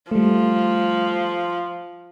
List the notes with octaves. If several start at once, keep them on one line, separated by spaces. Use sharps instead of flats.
F3 G3 A3